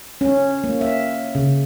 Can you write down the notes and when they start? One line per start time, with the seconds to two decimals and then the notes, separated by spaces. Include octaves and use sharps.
0.21 C#4
0.64 A#3
0.81 E5
1.35 C#3